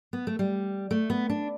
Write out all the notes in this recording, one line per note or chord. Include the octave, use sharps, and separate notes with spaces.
B3
A3
G3
A3
B3
D4